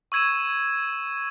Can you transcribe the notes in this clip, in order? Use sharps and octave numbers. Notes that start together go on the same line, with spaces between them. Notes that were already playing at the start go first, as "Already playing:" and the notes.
C#6 E6 G#6 D#7 E7